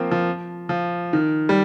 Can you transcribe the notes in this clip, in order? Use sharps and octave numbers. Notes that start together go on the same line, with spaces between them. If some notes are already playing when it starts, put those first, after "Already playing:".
Already playing: F3 A#3 C4
F3
F3
D#3
G3